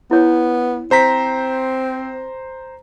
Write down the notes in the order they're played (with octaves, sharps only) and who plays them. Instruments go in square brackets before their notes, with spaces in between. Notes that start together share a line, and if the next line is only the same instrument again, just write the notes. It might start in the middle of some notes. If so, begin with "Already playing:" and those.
[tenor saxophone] B3 [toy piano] E4 C#5
[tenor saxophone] C4 [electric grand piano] C5 A#5 B6